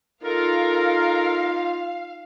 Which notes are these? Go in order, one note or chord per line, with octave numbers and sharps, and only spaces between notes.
D#4 F4 A4 A#4 F5